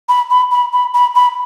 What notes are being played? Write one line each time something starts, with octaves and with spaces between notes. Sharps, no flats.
B5
B5
B5
B5
B5
B5